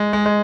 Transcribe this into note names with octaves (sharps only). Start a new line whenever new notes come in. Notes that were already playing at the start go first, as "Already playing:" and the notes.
Already playing: G#3
G#3
G#3